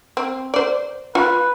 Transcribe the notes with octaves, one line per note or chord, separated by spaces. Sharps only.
C4
C5 D5
F4 B4